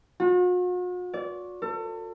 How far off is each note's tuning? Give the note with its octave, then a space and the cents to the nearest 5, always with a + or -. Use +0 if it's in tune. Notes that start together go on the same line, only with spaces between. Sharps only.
F#4 -45
D5 -30
A4 +35